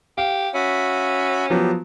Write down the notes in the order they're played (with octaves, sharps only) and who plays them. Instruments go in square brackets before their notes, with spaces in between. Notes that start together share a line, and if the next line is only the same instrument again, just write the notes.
[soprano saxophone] G4 [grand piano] F5
[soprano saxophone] C#4 [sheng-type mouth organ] F#4 E5 B5
[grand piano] F3 F#3 B3 [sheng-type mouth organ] G4